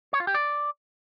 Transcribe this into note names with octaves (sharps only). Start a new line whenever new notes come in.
C#5
F4
G4
D5